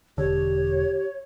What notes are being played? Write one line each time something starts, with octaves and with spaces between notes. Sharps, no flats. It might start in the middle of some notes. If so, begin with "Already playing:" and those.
E1 D3 G4 C#5